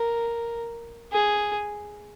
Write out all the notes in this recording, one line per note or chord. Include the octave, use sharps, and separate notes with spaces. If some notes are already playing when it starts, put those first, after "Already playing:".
Already playing: A#4
G#4